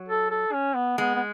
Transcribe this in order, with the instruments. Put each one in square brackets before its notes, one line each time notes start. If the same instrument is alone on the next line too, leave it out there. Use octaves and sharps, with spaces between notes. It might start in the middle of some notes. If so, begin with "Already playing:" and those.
Already playing: [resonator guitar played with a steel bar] F#3
[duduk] A4
A4
C#4
B3
[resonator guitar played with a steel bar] G#3 [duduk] B3
[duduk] B3